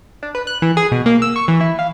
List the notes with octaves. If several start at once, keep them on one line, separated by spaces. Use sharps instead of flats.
D4
B4
F#6
E3
G#4
B2
A#3
E6
C#6
E3
E4
F5